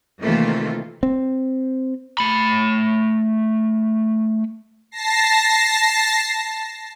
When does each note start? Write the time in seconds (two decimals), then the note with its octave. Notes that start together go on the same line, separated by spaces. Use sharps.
0.22 C3 D#3 E3 A3 A#3 F4
1.03 C4
2.19 A3 B5
4.91 A5 A#6 C7